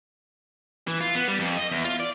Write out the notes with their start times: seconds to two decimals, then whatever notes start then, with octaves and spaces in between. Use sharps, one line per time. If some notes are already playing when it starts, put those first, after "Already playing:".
0.87 E3
1.01 F4
1.15 B3
1.28 G3
1.39 F2
1.57 D#5
1.71 E2
1.85 F4
2.00 D5